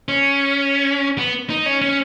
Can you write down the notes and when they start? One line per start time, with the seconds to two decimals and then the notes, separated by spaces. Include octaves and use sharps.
0.08 C#4
1.18 B3
1.50 D#4
1.66 C#4
1.82 C#4